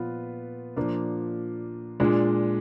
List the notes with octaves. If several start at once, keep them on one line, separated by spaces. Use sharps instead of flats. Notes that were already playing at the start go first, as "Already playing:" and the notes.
Already playing: A#2 F3 B3 F4 B4
A#2 F3 A#3 D4
A#2 G#3 D4